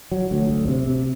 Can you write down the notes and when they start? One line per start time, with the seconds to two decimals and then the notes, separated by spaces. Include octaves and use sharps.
0.12 F#3
0.31 D2
0.50 D2
0.68 C3
0.87 C3